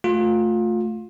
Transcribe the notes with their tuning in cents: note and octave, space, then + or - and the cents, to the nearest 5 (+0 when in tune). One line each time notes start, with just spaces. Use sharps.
A3 +0 F4 +25